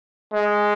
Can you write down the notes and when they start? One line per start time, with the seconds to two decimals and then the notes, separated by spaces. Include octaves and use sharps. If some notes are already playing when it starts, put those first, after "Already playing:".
0.33 G#3